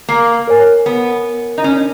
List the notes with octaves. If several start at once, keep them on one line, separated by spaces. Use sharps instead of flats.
A#3
A#4 C#5 G#5
B3
D#4
C#4